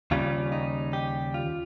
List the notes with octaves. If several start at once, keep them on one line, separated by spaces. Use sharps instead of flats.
D#2 C#3 G3 F4
D#4
G4
F4